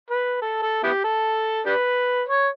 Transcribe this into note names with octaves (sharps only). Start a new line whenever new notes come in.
B4
A4
A4
B3 E4 G4
A4
D4 G4 B4
C#5